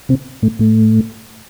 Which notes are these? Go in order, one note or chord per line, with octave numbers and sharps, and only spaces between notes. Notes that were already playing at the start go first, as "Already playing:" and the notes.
C3 C4
A2 A3
A2 A3